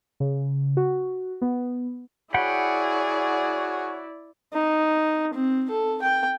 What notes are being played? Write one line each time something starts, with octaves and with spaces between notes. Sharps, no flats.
C#3
F#4
B3
E4 F#4 G#4 C#5 D5 F#5 G5 B5
D#4
C4
A4
G5